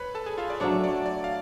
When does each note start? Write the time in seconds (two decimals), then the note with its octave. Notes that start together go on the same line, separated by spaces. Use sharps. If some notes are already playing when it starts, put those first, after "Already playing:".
Already playing: B4 C#5 B5
0.15 A4 A5
0.26 G#4 G#5
0.38 F4 F5
0.50 D5
0.60 F#3 A3 D4 C#5
0.84 D5
1.06 D5
1.24 F5